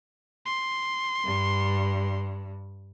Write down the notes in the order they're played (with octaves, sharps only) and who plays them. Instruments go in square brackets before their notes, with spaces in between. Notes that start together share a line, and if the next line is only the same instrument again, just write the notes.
[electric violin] C6
[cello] G2